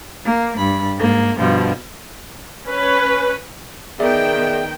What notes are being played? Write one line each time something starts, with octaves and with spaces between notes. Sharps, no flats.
A#3
G2 B5
G#2 A#3
G2 B2 F3
C#4 B4
D#3 B3 G#4 D5 E5 G5